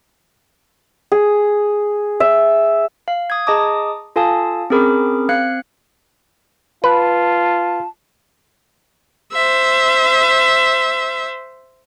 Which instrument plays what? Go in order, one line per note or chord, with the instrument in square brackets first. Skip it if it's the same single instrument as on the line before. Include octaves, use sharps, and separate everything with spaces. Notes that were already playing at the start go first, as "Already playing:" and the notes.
[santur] G#4
E5
[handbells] F5
D#6 G#6
G#4 D#5 A5 A#5 D6 D#6
F4 A4 F5 G#5 A5 D#6
C4 C#4 G#4 A#4 B5 D6
C4 F5 F#6 G#6 C#7
[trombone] F4 [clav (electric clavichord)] B4 [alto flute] A5
[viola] C5 E5